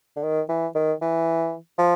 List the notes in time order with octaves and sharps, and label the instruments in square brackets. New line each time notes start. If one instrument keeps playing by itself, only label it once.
[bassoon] D3
D#3
E3
D#3
E3
F3